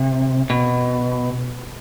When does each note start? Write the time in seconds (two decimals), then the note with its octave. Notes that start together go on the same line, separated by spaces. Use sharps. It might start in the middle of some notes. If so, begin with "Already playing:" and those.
Already playing: C3
0.50 B2